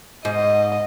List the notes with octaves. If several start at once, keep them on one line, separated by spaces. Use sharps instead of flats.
G#2 D#5